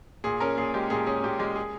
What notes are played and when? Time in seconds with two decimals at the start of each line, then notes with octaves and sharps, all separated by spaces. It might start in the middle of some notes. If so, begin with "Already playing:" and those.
0.24 A#2 G#4
0.40 C#4 A#4
0.57 A#2 G#4
0.74 G#3 G4
0.90 A#2 G#4
1.07 C#4 G#4
1.23 A#2 G4
1.39 G#3 G4
1.56 G#4